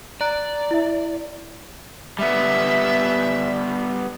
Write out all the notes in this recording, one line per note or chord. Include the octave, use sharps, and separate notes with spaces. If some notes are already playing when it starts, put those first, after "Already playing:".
D5 A#5 F#6 D7
E4 E5
G3 B3 E5